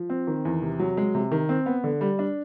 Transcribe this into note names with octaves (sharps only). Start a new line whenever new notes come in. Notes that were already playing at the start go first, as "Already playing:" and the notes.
Already playing: F3
C4
D#3
E2
C3
F#3
G#3
C3
D#3
C4
B3
D3
G3
D4